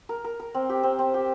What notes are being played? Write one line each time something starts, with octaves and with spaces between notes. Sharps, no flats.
A#4
A#4
A#4
C4
G4
C4
C4
G4